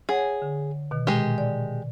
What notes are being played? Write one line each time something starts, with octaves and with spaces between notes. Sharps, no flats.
G#4 C#5 F#5 G#5
D3
B2 D#3
A#2 G#3 G4 G5
D5